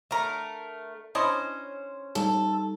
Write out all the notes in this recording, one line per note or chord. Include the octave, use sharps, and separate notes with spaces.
D3 A3 A#4 A#5
C#4 D4 E4 C5 D#5
G3 D#4 A4